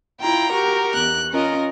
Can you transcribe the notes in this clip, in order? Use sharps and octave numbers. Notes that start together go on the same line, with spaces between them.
E4 F4 G5 A#5
F#4 G4 A#4
E2 F#6
C#4 F4 A#4 D#5